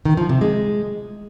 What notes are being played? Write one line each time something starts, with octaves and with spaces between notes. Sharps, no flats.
D#3
F3
C3
G#3